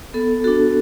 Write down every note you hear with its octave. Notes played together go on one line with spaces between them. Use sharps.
B3 A4
D4 F#4 A4